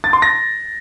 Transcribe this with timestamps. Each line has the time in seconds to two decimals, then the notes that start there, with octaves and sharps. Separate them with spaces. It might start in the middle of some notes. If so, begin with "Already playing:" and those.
0.04 A6
0.13 C6
0.22 A#6